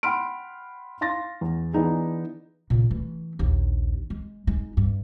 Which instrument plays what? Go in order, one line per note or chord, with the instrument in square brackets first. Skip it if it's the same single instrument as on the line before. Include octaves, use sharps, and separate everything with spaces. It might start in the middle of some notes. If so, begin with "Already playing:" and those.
[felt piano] F#5 G5 B5 C6 F6 D7
F5 C6 A6 A#6
E2
E3 B3 D4 D#4 G#4
[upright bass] A#2 C#3
E3 A3
A#1 D#2
G#3
G#3 D#4
G2